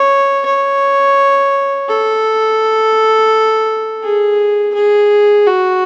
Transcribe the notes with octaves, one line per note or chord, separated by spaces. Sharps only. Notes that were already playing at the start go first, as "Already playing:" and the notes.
Already playing: C#5
C#5
A4
G#4
G#4
F#4